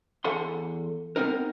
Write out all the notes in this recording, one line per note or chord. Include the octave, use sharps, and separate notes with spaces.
E2 A4 F#5 C6
B3 C4 D#4 A#4